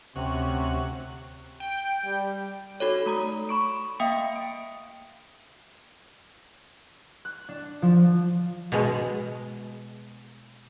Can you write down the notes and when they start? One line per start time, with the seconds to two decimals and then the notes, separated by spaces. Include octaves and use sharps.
0.16 D2 C3 C#4 F#5
1.60 G5
2.05 G3
2.80 D#4 F#4 A4 C#5
3.06 A3 A#5 D#6
3.49 B5 C#6 D7
4.00 A#3 E5 F5 G5 D#6 C#7
4.36 D7
7.25 F#6
7.49 D4
7.82 F3
8.72 B2 G#3